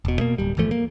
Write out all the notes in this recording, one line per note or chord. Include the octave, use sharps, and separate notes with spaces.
E1 B2
B2 A3 A#3
D1 G3
G1 E3 F3 A3
A#3